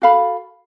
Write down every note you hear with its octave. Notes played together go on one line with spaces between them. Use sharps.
F#4 A4 F5 B5